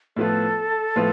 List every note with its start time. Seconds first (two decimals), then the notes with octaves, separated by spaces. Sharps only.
0.16 A2 F3 B3 F4 A4 B4
0.96 A2 F3 B3 F4 B4